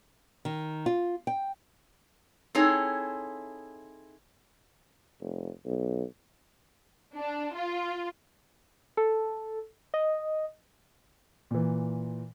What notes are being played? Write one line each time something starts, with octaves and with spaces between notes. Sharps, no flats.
D#3
F4
G5
C4 D#4 E4 G#4 A4 C#5
F1
B1
D4
F4
A4
D#5
A#2 E3